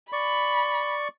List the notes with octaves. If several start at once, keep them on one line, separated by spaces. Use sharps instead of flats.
D5 B5 C#6